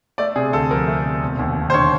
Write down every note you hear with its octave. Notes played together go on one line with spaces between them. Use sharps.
A3 D5
C3 G#4
D2 A4
F3 A#4
A3
C3
E1
D#2
E1
C5
D3 C#5